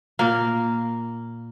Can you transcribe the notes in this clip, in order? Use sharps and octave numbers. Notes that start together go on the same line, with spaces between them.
A#2 A#3 A#4 F5